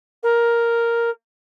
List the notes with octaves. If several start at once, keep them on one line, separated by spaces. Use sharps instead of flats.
A#4